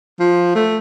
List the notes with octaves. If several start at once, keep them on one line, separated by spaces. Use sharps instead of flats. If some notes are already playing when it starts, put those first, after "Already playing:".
F3
A3